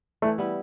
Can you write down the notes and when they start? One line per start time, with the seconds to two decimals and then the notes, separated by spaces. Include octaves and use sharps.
0.22 E3 A3
0.38 G3 B3 E4